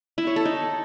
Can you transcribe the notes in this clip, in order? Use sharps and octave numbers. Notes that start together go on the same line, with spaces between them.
E4
C#5
A4
D#4